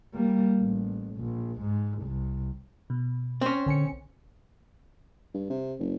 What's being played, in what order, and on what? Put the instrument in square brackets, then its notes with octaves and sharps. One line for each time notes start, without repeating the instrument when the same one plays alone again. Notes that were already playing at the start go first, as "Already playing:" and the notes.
[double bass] G3 A#3
A1
A#1
G#2
C2
[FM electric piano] B2
[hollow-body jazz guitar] C4 C#4
[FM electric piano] A#1 G#5 C#7 [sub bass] D3
[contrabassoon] G2
C3
F#1